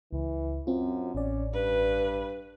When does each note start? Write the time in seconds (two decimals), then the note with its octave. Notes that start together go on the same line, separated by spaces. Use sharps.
0.13 C#2 E3
0.67 F#2 C4 F4
1.15 A1 C#4 D5
1.54 G2 B4